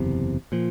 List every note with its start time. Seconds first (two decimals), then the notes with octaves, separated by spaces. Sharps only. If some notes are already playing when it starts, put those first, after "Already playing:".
Already playing: F#1 E2 C3
0.52 A#2 F3